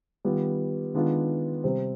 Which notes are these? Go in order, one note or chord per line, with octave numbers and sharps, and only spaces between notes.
D#3 G3 B3 F4
D#3 G#3 B3 D4 F4
C3 G3 C4